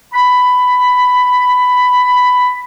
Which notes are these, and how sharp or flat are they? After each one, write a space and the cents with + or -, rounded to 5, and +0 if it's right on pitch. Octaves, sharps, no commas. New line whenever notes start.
B5 +10